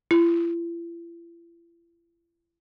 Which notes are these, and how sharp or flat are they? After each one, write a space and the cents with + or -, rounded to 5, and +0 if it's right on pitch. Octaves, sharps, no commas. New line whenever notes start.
E4 +45